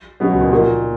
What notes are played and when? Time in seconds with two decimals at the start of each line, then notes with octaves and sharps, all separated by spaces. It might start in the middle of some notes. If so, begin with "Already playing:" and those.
0.20 B2 F#3 B3 C#4 F#4
0.30 C#2 C#3
0.41 A#2
0.52 A#2 F3 A#3 D#4 F#4